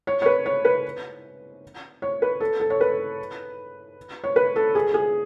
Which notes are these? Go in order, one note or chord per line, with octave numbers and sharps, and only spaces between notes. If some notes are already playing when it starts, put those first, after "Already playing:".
C#5
C#5
B4
C#5
B4
C#5
B4
A4
A4
C#5
B4
C#5
B4
A4
G#4
G#4